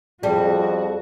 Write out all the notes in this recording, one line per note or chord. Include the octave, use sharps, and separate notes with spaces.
F2 G3 F#4 G#4 A5